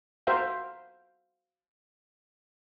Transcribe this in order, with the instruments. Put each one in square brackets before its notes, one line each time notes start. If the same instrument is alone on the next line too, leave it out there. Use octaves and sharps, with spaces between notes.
[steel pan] F#4 A#4 C5 E5 F5 G5